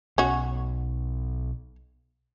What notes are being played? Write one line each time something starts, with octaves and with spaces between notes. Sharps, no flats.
B1 C#4 F#4